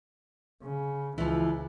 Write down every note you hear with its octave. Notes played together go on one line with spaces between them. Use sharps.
C#3
C#2 E3 F3